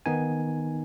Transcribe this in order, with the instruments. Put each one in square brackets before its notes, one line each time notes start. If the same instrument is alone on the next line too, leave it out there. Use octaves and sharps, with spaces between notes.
[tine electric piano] D#3 B3 D#4 G#5